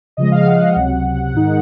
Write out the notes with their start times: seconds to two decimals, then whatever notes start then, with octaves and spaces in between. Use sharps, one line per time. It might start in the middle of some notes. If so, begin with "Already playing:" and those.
0.17 C#3 F3 G#3 D#5
0.31 F5
0.46 F#5
0.61 F#5
0.76 C#2 C3 F#3
1.34 G#2 D#3 G#3 D#4